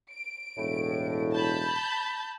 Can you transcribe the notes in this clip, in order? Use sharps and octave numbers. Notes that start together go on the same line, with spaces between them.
D7
E1 A2
A5 B5 G6